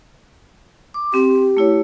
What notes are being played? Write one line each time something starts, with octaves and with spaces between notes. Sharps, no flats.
D6
C4 G4
A3 E4 C#5